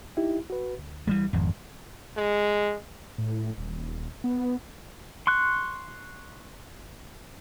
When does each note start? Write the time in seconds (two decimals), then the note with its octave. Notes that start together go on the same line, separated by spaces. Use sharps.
0.17 D#4 E4 G4
0.50 F#4 B4
0.79 D2
1.07 E3 G3 G#3
1.33 G#1 F2
2.17 G#3
3.18 A2
3.58 D#1
4.24 B3
5.27 C6 C#6 F#6